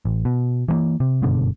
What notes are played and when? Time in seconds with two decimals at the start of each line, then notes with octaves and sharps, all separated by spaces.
0.05 A1
0.25 B2
0.68 E3 F3 A#3
1.00 C3
1.22 F#1 G2 B2 D3